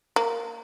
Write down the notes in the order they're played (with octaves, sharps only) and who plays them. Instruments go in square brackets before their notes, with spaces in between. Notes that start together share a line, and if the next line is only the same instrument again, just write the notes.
[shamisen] A#3